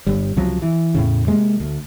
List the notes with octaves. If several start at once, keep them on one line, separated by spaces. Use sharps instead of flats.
G1 G3
C#2 C3 F3 F#3
E3
E2 A2 C#3
C3 G#3 A#3
D2